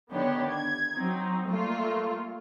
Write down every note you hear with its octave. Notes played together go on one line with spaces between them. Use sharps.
D3 D#3 B3 D4 G4 C#5
G#6
F#3 C4 D#4
G3 A3 A#3 F4